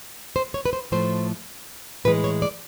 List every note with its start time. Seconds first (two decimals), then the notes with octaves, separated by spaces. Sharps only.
0.36 C5
0.54 C#5
0.65 B4
0.73 C5
0.92 A2 F3 A3 C5
2.05 A2 E3 G#3 B4
2.24 C#5
2.42 D5